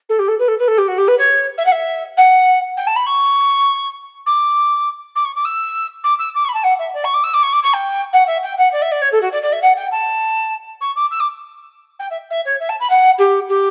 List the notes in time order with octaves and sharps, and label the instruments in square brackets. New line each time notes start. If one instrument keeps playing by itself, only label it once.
[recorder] A4
G4
A4
B4
A4
B4
A4
G4
F#4
G4
B4
C#5
E5
F#5
E5
F#5
G5
A5
B5
C#6
D6
D6
C#6
D6
E6
D6
E6
D6
C#6
B5
A5
F#5
E5
D5
C#6
D6
E6
D6
C#6
D6
C#6
G5
F#5
E5
G5
F#5
D5
E5
D5
C#5
A4
F#4
D5
D5
E5
F#5
G5
A5
C#6
D6
E6
D6
G5
E5
E5
C#5
E5
A5
B5
F#5
G4
G4